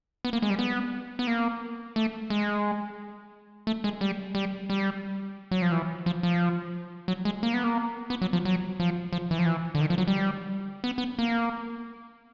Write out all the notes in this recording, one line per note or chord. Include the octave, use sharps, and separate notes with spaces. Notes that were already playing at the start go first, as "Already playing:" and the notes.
B3
A#3
G#3
G3
B3
B3
A#3
A3
G#3
A3
G#3
G3
G3
G3
F#3
F3
E3
F3
F3
F#3
G#3
A#3
B3
A#3
B3
F#3
F3
F#3
F3
F3
E3
F3
E3
D3
D#3
F3
F#3
G3
B3
B3
A#3